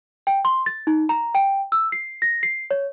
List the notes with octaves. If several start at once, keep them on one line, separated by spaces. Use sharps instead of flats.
G5
C6
A6
D#4
A#5
G5
E6
C7
A#6
C7
C#5